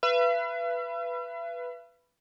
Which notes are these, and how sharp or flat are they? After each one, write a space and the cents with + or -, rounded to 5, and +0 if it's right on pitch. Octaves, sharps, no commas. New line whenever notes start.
B4 +0 E5 +45